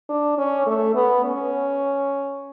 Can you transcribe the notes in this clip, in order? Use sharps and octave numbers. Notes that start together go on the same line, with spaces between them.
D4
C#4
A3
B3
C#4